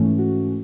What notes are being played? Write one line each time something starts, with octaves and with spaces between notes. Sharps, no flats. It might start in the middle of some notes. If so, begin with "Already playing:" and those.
Already playing: G#2 E3 A3 C#4
F#4